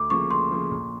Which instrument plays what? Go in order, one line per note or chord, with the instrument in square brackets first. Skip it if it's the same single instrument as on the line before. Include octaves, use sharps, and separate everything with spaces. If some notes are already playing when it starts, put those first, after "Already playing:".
Already playing: [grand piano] D2 [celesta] D6
[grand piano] C#3 F3 A#3 [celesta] C#6
[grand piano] D2 [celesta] C6
[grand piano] C#3 F3 A#3
A#1